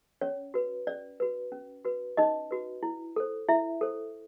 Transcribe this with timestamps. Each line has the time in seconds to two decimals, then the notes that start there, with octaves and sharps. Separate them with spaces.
0.21 C#4 C#5
0.54 F#4 B4
0.87 C#4 D5
1.20 F#4 B4
1.52 C#4
1.85 F#4 B4
2.17 C#4 D#4 D#5
2.51 F#4 B4
2.83 E4
3.16 A4 C5
3.49 E4 E5
3.81 A4 C5